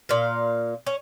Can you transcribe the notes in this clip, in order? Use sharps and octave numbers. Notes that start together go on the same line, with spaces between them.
A#2 F5
C#4